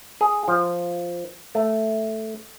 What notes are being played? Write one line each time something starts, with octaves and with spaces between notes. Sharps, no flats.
G#4
F3
A3